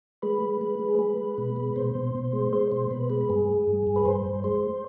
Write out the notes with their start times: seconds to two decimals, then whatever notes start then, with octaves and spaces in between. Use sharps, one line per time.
0.22 G#3 B4
0.42 G#3
0.61 G#3
0.79 G#3
0.89 G#4
0.99 G#3 B4
1.18 G#3
1.38 B2
1.56 G#3
1.76 B2 C5
1.95 B2
2.15 B2
2.33 G#3
2.53 G#3 C5
2.72 B2 C5
2.91 B2 B4
3.10 G#3 B4
3.21 B4
3.30 G2 G#4
3.48 G#3
3.67 G2
3.87 G2
3.96 B4
4.05 G2 C5
4.26 G2
4.44 G#3 C5